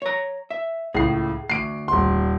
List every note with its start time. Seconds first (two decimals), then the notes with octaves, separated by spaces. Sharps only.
0.02 C#5 A#5
0.50 E5
0.94 C#2 A2 G#4 C7
1.50 D2 C7 D7
1.88 D#1 C6